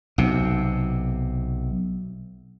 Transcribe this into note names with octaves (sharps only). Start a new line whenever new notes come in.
B1 C3